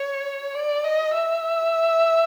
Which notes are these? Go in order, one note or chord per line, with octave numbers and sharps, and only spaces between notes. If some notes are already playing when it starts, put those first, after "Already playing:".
Already playing: C#5
D5
D#5
E5